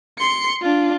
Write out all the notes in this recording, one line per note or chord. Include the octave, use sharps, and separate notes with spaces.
C6 C#7
D4 F4